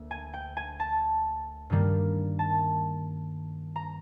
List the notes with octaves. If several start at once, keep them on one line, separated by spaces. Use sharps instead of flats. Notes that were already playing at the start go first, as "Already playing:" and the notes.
Already playing: D2 A#3
G#5
G5
G#5
A5
G2 D#3 G3 A#3
A5
A#5